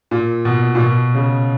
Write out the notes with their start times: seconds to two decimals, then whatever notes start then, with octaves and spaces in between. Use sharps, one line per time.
0.11 A#2
0.45 B2
0.75 A#2
0.80 B2
1.15 C#3